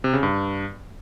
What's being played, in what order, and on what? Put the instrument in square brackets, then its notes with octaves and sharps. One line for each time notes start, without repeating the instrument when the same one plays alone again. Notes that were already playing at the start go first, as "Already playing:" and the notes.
[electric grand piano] C3
C#3
G2